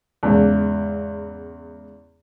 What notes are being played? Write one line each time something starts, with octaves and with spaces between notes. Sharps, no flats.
E2 G#2 C#3